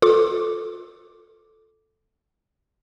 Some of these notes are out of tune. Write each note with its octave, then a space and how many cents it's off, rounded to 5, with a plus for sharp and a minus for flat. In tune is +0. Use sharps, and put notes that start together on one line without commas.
F4 +30 A4 +0 D6 +0